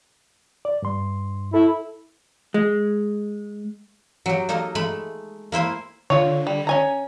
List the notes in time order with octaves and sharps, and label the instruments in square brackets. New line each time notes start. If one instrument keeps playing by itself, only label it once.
[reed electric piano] D5
G2 C6
[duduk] E4 [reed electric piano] A4
[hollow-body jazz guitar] G#3
[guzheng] F#3 G4
A#3 D#4 A4 D#5
G#3 A3 B5
A#3 E4 C5 G#5
[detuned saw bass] D3 [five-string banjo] F4 C#5
[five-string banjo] G3
C#4 G#5 A#5